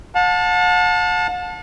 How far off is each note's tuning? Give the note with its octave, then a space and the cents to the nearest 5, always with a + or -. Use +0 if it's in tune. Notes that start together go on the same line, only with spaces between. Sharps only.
F#5 -45 A5 +0